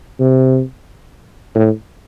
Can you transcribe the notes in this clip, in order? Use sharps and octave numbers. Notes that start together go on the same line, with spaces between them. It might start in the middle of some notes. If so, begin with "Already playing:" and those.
C3
A2